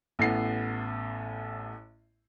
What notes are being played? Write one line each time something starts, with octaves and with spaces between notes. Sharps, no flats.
A1 A2 A3 B3 C7